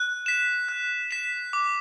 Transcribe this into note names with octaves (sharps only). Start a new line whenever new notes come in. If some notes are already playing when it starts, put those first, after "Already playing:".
Already playing: F#6
B6 E7
F#6
B6 E7
D6